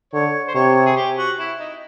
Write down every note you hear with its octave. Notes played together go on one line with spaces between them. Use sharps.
D3 C#5
C5
C3 C#5
G#4
G4
F#4
E4
D#4